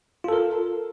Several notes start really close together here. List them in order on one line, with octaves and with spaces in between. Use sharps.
F4 A4 A#4